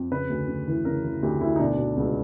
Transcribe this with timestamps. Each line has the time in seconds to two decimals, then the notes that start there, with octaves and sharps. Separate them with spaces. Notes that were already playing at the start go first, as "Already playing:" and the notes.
Already playing: F2
0.11 C#3 B4
0.30 D2
0.48 C#3
0.67 E3
0.85 C#3 A#4
1.05 E3
1.23 D2 G4
1.41 D2 E4
1.56 D#4
1.60 B2 D4
1.78 B2
1.97 C#2